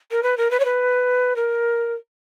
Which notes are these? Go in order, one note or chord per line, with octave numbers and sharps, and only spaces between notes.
A#4
B4
A#4
B4
C#5
B4
A#4